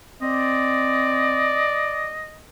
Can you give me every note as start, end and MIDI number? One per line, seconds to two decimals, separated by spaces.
0.22 1.70 60
0.22 2.13 74
0.22 2.38 75